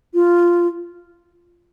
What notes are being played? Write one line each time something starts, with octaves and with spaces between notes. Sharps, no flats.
F4